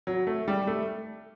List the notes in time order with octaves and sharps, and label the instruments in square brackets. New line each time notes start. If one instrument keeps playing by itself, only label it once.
[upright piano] F#3
A3
G3
A3